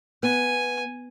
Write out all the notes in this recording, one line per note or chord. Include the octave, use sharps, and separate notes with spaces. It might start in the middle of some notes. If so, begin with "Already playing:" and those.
B3 G#5